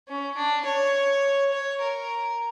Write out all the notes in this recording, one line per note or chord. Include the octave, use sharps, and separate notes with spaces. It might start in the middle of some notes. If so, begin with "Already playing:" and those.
C#4
D4
C#5
C#5
A#4